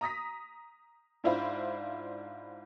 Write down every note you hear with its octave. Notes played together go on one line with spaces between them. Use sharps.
A#5 D#6 A#6 B6
G#2 D4 E4 F4 C5 B5